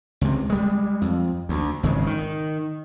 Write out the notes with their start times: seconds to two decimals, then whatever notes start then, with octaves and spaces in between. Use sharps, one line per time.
0.21 C#2 C3
0.50 G3 G#3
1.02 F2
1.49 D2
1.83 G#1 C#3 G#3
2.06 D#3